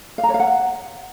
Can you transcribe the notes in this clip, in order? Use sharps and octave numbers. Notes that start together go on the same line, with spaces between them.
F5
A#5
C#5
F5
F#5